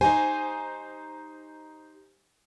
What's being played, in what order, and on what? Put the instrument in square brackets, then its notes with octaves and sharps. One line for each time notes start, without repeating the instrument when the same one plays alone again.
[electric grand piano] D#4 C5 [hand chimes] G4 [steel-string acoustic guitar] G#5